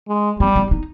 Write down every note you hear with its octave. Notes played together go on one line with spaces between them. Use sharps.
G#3
G3 C4
D4
D#4